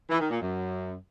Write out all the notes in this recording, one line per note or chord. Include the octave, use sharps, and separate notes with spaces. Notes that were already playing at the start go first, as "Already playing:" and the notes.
E3
D#3
A#2
F#2